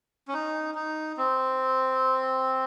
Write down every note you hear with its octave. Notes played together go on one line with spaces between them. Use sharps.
C#4
D#4
D#4
C4